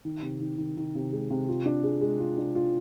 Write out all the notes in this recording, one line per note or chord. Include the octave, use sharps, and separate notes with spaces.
D#3
C3
D#3
D#3
D#3
C3
G#3
C3
F4
D4
G#4
G#3
F4
D4
F4